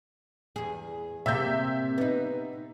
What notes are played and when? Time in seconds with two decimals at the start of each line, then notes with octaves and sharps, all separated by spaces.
0.56 E2 G#4
1.26 C3 A#3 E5 E6 G6
1.98 B3 D#4